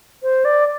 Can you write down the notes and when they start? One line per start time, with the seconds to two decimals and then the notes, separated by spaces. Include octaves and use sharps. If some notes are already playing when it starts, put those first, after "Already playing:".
0.23 C5
0.45 D5